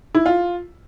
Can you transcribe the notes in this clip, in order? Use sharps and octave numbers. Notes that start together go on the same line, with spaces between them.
E4
F4